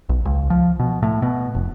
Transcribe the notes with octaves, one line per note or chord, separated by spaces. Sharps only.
B1
C#2
F3
B2
A2
B2
F1